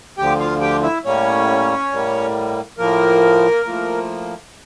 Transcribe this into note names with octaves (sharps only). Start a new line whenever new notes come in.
D2 D3 F3 G4 G5
F4 F5
G4 G5
E4 E5
A2 G3 A#3 C#4 C#5
A2 G3 A#3
A2 F3 A#3 A#4
A2 F3 A#3